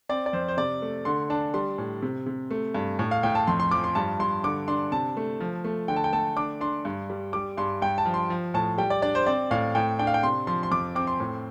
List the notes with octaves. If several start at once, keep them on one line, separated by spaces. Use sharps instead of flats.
C4 D5
D5
F2 C5
C5
C3 D5
A3
D3 C6
D4 A5
G3 C6
A2
C3
C3
A3
G2
A2
F5
A2 G5
A5
F2 C6
C6
F3 D6
C6
G2 A5
G2 C6
D3 D6
D4 C6
C3 A5
A3
F3
A3
D3 G5
A5
G5
A3 A5
D4 D6
D4 C6
G2
G3
G3 D6
G2 C6
G2 G5
A5
F3
C6
F3
A2 A5
G3 G5
D5
D4 D5
C5
C4 D5
A2 F5
A2 G5
D4 G5
F5
G5
C3 C6
F3 C6
C6
F2 D6
C4 D6
C6
A2